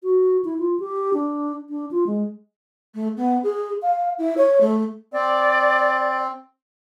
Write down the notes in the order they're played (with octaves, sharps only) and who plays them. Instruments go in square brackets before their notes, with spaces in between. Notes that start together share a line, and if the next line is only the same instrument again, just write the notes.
[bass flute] F#4
E4
F4
G4
D4
D4
F4
G#3
[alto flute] A3
B3
G#4
F5
E4
C#5
A3
[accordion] C4 [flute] D5